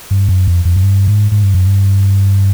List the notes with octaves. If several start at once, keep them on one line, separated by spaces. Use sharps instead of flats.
G2
F#2
F2
F2
F#2
G2
G#2
G#2
G2
F#2
G2